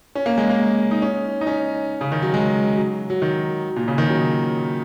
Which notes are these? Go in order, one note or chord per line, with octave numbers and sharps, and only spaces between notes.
C#4
A#3
G#3
A#3
D#4
C#4
D#4
C#4
C#3
D#3
F#3
G#3
F#3
F#3
D#3
A#2
C#3
D#3
F#3